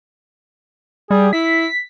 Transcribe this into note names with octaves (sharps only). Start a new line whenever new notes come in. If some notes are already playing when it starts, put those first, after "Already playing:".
G3 G#4
E4 B6